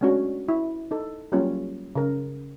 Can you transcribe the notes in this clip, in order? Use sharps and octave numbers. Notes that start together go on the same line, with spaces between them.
G#3 A3 C#4 D4 F#4
E4
D#4 A4
F#3 G3 A#3 C#4 F4
C#3 A#4